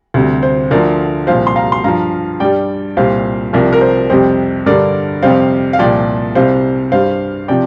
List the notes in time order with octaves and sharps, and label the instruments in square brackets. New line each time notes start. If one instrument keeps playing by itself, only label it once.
[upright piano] D2 C3 G3
C5
D2 D3 F3 A#4 D5
C2 A#2 F3 C5 F5
C6
F5 A#5
C6
G2 F3 F5 A#5
G2 G3 D5 G5
C2 A#2 G3 C5 F5
C2 C3 F3 A#4 D5
A#4
C5
F2 C3 G3 C5
G2 D3 G3 A#4 D5
F2 C3 G3 C5 F5
F5
C2 A#2 F3 D5 G5
C2 C3 G3 C5 F5
G2 G3 C5 F5
C3 F3 D5 G5